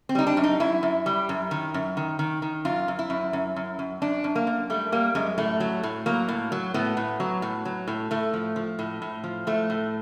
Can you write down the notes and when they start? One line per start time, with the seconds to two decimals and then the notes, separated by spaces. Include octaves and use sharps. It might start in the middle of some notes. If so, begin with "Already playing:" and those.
0.09 C4
0.15 G3 D#4
0.27 D4
0.37 F#2
0.44 D#4
0.60 F#2 E4
0.83 F#2
1.06 G3
1.29 F#2
1.51 D#3
1.74 F#2
1.97 D#3
2.19 D#3
2.42 D#3
2.65 F#2 F4
2.88 F#2
2.99 E4
3.10 F#2
3.33 F#2
3.56 F#2
3.79 F#2
4.02 F#2 D4
4.24 F#2
4.35 A#3
4.47 F#2
4.70 G3 A3
4.92 G3 A#3
5.15 F#2 G#3
5.38 A2 A3
5.60 F#3
5.83 A2
6.06 F#3 A#3
6.28 A2
6.52 F#3
6.74 A2 B3
6.97 A2
7.20 F#3
7.42 A2
7.65 F#3
7.88 A2
8.11 A2 A3
8.34 F3
8.56 F3
8.79 A2
9.02 A2
9.24 F3
9.47 A2 A3
9.70 A2